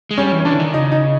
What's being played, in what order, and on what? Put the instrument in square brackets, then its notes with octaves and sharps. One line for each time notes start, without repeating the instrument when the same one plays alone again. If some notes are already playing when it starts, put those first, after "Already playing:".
[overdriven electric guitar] G#3
[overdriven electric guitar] G3 [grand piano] C#4
[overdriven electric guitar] E3
[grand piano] C#4
[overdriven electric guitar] E3 [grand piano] D4
[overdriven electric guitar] D3
D#3
[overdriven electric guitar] C#3 [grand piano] D#4
[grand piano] D#4